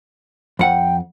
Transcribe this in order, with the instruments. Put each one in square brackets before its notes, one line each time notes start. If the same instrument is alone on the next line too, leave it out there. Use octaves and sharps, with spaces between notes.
[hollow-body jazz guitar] F2 F#5 [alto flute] G5